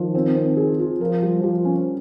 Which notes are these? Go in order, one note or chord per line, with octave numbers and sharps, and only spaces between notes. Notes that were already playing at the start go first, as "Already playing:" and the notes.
Already playing: D#3 F3
C4
C4
G#4
F4
F3 A#4
G3
F3 G4
C#4